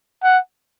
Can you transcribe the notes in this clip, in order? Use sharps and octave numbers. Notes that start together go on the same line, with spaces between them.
F#5